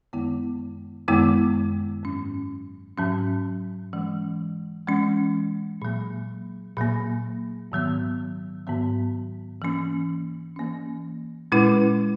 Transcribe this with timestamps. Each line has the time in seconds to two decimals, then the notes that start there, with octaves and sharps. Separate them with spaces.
0.13 F#2 D#3 G#3 B3 E4
1.08 F#2 D#3 G#3 B3 E4
2.03 G#2 F#3 C#4
2.98 G#2 F#3 C#4
3.93 E3 G#3 C#4
4.87 E3 G#3 C#4
5.82 A#2 F#3 A#3
6.77 A#2 F#3 A#3
7.72 G#2 D#3 F#3 B3
8.67 G#2 D#3 F#3 B3
9.62 E3 A#3 C#4
10.56 E3 A#3 C#4
11.52 A#2 G#3 C#4 E4 B4